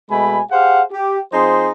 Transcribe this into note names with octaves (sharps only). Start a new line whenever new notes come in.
B2 G#3 A3 G#5 B5
G4 G#4 C5 F5 F#5
G4
F3 C4 D#4 G#4 C5 C6